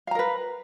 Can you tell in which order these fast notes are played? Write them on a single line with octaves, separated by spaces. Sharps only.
F5 A#5 A#4 B4